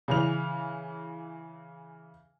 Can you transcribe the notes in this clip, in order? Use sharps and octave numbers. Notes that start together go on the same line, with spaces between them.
C#3 E3 F7